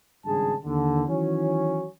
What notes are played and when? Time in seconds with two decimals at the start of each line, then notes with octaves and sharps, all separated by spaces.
0.25 G#1 G2 C#3 G#4 A5
0.65 D#2 D3
1.08 D#3 E3 F#3 C#4